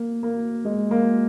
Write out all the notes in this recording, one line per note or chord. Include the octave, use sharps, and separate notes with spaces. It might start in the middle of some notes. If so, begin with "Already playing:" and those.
Already playing: A#3
A#3
G#3
A#3